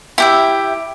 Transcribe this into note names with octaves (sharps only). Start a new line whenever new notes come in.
E4 G4 E5